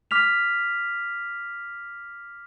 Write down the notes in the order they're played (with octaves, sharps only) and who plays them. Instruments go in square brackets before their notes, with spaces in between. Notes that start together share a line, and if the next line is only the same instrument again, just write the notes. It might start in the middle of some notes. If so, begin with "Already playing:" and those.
[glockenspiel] D6 F6 B6 F7